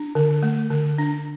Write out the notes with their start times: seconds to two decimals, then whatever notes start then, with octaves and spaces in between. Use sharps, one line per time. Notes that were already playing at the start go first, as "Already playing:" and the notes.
Already playing: D4
0.15 D3
0.43 A3
0.70 D3
0.98 D4